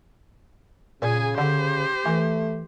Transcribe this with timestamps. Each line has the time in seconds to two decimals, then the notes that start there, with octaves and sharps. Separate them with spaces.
1.02 A#2 C#3 G#4 G#5
1.38 D3 G4 C5
2.06 E3 A3